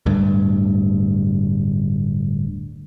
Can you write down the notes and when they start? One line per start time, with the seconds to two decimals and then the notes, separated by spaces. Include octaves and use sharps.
0.06 D1 D2 G2